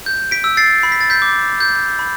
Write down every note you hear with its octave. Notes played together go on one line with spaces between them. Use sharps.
G6
B6 D7
E6
A6 C7
B5 C7
B6
A6
G6 B6
D6
G6
B5